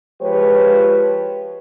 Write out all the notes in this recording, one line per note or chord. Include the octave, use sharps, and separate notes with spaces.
F3 G#3 G4 B4 C#5